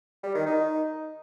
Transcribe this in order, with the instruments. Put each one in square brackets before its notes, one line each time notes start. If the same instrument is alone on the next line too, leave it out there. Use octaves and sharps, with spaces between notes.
[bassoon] G3
D#3
D#4